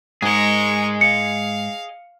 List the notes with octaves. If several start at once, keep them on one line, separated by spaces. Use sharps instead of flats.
G#2 G#4 A#4 D#5 C#6
F5 C#7